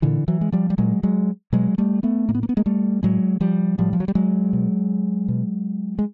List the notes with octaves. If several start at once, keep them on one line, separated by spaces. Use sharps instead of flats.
A#2 D3 E3
E3 F#3
G#3
F3 G3
G3
A#2 F#3 G#3
F#3 G#3
B2 F#3 G#3
G3 A3
A3 B3
A2 A#3
B3
A#3
B3
G#3 A#3
G3 A3
A2 F#3 G#3
F3 G3
A2 F3 G3
F3
F#3
G3
F#3 G#3
B2
B2
G#3